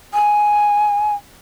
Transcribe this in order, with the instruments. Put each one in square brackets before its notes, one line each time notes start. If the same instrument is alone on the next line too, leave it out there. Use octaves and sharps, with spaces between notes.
[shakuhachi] G#5